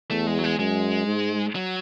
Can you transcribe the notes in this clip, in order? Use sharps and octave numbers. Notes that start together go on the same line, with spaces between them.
E2 A3
G#3
F#3
G#3
F#2 G#3
G#2
F#3